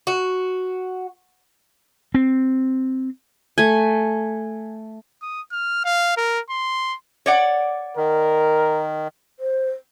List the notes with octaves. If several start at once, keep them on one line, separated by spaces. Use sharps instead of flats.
F#4
C4
A3 G#5
D#6
F6
F5
A#4
C6
C#5 D5 F#5
D#3 A#4
C5